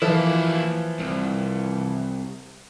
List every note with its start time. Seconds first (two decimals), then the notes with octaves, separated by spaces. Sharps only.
0.02 E3 F3 A#3 E4
0.99 C2